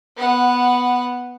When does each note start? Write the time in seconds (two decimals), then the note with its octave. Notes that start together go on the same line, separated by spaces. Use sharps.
0.17 B3 F#5